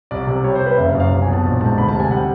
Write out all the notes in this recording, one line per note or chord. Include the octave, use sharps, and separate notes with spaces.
C2 D5
C3
G3 C#5
C5
C3
B4
F#1 E5
F5
F#2
F5
C2
G#5
B2
A5
A#1
G#2 A5
D2 B5
A5
C3
G#5
G3 F#5